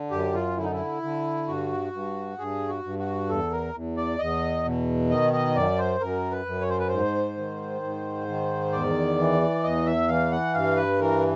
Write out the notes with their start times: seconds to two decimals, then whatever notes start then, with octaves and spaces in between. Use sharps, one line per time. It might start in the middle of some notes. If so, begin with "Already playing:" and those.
Already playing: D3
0.11 F#2 G4
0.34 F4
0.57 D3 E4
0.64 D#4
0.72 E4
1.02 D3
1.48 G2 F#4
1.93 G2
2.38 G2 G#4
2.69 F#4
2.84 G2
2.99 F#4
3.29 E2 A4
3.52 A#4
3.74 E2
3.97 D5
4.19 E2 D#5
4.65 B2
5.10 D#3 D#5
5.33 D#5
5.55 F#2 D5
5.78 C5
6.00 F#2 A#4
6.31 B4
6.46 F#2
6.61 C#5
6.69 C5
6.79 B4
6.88 G#2 C5
7.37 D#3
7.82 G#2
8.28 D#3
8.72 E2 D5
9.19 E3
9.63 E2 D#5
9.86 E5
10.08 E3 F5
10.32 F#5
10.54 G2 F5
10.76 B4
11.00 E3 A#4